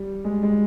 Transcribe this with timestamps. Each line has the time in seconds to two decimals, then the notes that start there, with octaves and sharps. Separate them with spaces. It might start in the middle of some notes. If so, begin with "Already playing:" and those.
Already playing: G3
0.25 G#3
0.43 G#3